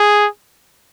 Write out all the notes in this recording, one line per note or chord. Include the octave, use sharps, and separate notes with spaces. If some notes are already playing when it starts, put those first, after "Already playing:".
Already playing: G#4